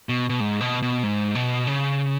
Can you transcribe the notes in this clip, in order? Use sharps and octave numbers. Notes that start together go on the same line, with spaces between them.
B2
B2
G#2
B2
B2
G#2
B2
C#3